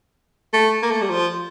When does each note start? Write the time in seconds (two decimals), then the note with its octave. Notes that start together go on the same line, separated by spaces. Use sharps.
0.53 A3
0.82 A#3
0.91 A3
1.01 G3
1.10 F3